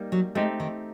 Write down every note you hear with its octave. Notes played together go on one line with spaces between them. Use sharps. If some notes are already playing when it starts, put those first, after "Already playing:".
Already playing: G3 A#3 D#4
F#3
G#3 A3 C4 D#4 G4 C5
D#3